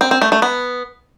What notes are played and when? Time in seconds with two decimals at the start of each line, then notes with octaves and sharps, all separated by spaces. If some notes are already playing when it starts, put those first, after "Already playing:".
0.01 C4
0.11 C4
0.22 A3
0.32 A3
0.42 B3